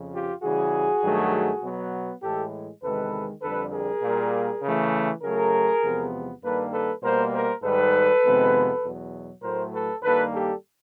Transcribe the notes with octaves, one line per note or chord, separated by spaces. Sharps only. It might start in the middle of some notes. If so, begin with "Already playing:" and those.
Already playing: F2 C#3 F3
F4 G4
C#3 E3 G3 F#4 G#4
G2 D#3 F#3 A3
B2 F#3 B3
A2 E3 G#3 G4 A4
E2 C3 D#3 G#3 A4 B4
F2 D3 G3 A4 B4
G#4 A#4
A#2 G3 A#3
C#3 E3 A3
C#3 F#3 A3 G#4 A#4
E2 C3 F3 G#3 B3
G2 D#3 G3 A#3 A4 B4
A4 B4
B2 G3 A#3 A#4 C5
A#4 C5
G#2 D#3 G3 A4 B4
F2 C3 D#3 G#3 B3
E2 B2 F#3
A2 F#3 A3 A#4 C5
A4 B4
G2 D#3 G3 A#3 A4 B4
G4 A4